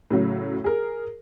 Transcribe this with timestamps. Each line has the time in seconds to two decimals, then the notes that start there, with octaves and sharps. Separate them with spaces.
0.10 A2 C#3 F#3
0.64 G#4 A#4